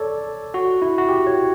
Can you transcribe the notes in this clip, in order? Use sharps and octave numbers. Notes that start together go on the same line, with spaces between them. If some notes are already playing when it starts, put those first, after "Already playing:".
Already playing: A4 C#5 D5
F#4
E4
F#4
G4
C#5